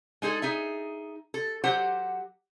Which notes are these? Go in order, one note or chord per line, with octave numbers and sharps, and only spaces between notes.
G#3 D#4 G#4 A4
D#4 G#4 E5
A4
F#3 G4 C5 F#5